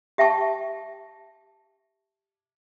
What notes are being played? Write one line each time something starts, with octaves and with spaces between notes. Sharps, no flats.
G4 E5 G5 A5 C#6